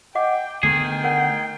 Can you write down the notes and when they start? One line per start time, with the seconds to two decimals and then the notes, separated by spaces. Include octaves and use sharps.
0.15 D#5 F#5 G5 D6
0.63 D3 D#3 A3 B3 G#4 G5
1.04 A#4 F#5